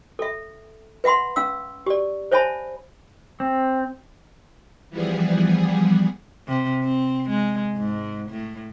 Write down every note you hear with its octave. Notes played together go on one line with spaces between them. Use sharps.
A4 E5
B4 E5 F#5 B5 C6
C#4 F5 E6
G4 D5
C5 C#5 E5 G#5 A5 B5
C4
E3 F3 G3 B3 G#4
C3
C4
G#3
G#2
A2